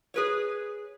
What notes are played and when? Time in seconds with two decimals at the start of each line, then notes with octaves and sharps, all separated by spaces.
0.14 G#4 B4 C#5